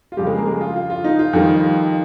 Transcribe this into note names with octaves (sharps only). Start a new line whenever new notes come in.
F4
F2 C#3 G3 G4
G#3 G#4
A#3 A#4
G#3 G#4
F4
F4
F4
D#4
F4
F2 D#3 G3